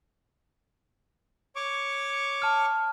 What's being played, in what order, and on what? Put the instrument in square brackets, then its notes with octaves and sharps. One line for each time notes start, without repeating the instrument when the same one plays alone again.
[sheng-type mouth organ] C#5 C#6 D6
[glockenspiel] A5 F6